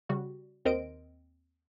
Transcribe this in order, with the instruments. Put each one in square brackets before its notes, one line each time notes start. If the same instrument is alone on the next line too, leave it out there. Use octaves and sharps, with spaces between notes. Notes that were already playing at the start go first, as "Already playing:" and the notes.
[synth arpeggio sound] C#3 G3 F#4
D#2 C4 A#4 C5 D#5 D7